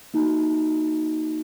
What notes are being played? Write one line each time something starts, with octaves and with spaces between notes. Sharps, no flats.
A#3 D#4 F#4